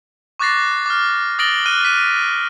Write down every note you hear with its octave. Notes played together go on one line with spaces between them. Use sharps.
C#6 D6 F#6 A6 A#6 C7
D6 F6
D#6 A6 A#6 D7 F#7 G7
F6 F#6 D#7
B6 D#7